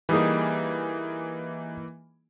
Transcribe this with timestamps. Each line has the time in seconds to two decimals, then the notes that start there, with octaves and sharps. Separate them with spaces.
0.09 E3 G3 A#3 D#4 G#4